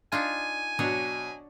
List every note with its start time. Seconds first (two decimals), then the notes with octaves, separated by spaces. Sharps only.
0.12 D4 D#4 F4 G#5
0.79 B2 F#3 D4 C#5 F#5